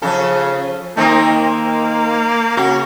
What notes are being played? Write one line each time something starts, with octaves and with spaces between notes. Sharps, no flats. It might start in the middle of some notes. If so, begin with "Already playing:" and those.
C#3 F3 A4
D#3 A#3 C4 D#4
C#3 F#4